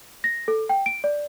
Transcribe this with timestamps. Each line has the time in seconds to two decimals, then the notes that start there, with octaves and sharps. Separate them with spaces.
0.24 A#6
0.48 A4
0.69 G5
0.86 D7
1.04 D5